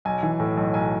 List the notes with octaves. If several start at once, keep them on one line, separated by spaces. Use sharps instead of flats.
B1 G#5
E3
A2
B1
B1 G#5